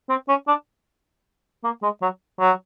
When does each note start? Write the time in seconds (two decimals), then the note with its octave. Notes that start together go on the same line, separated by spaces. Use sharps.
0.09 C4
0.28 C#4
0.47 D4
1.64 A#3
1.82 G#3
2.02 F#3
2.40 F#3